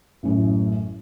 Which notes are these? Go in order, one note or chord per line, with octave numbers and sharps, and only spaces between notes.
A1 F#2 A2